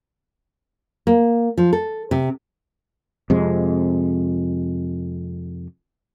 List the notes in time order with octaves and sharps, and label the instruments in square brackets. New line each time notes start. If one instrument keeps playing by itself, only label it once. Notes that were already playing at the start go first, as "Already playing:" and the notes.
[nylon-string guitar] A#3
F3
A4
C3
[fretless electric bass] F2 C3 G#3